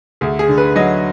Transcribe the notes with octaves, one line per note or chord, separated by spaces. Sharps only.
D2 G#4
G#4
D3
B4
F#3 D#5